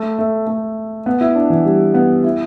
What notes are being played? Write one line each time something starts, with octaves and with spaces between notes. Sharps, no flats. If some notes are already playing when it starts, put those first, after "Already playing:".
Already playing: A3
A3
A3
B3
E4
D4
E3
G3
B3
E4